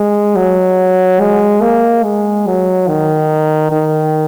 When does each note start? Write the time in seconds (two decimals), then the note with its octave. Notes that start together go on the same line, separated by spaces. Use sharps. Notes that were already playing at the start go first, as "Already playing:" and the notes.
Already playing: G#3
0.36 F#3
1.20 G#3
1.61 A#3
2.04 G#3
2.46 F#3
2.88 D#3
3.72 D#3